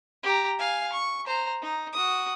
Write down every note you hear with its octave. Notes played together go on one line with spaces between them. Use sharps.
G4 A#5
F5 G#5
C#6
C5 A#5
D#4
F#4 D#6